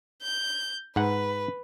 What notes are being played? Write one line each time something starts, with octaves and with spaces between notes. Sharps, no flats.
G6
G#2 B4 F#5